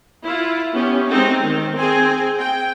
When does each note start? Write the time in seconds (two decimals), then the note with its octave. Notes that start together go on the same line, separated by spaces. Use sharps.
0.23 E4 F4
0.73 B3 C#4 G4
1.10 G#3 C4 D#4
1.45 D#3
1.78 C4 G#4 G#5
2.39 G5